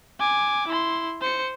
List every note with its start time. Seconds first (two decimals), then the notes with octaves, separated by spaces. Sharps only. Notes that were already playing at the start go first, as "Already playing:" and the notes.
0.19 G#5 D6
0.67 E4 C6
1.21 C5 C#7